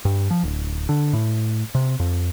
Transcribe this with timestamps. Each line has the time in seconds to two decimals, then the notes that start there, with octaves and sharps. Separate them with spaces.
0.05 G2
0.31 F3
0.43 D1
0.89 D3
1.13 A2
1.75 C3
2.00 F2